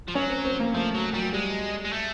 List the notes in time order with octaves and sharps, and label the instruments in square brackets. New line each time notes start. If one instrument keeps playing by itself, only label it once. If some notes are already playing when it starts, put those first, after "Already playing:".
[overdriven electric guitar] F3
[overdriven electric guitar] F#3 [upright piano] C#4
[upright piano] C4
C4
A#3
[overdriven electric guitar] F3 [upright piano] A3
[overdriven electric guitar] F#3
[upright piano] F#3 [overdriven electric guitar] G3
[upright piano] G3 [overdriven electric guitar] G#3
[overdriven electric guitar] G#3
A3